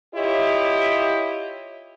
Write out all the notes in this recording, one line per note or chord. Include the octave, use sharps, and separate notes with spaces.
E4 F4 G4 C#5 D#5